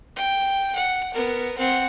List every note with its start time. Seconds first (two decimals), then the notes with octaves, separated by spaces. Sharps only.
0.16 G5
0.76 F#5
1.14 B3 A#4
1.58 C4 F#5